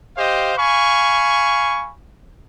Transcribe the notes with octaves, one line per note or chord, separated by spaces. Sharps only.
G4 C5 D#5 F5
F5 G#5 B5 C#6